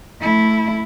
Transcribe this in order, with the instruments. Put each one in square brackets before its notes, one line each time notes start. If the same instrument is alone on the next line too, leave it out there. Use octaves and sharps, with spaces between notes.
[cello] A3 E4